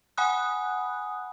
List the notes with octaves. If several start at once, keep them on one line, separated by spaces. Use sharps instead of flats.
F#5 G#5 B5 D#6 F#6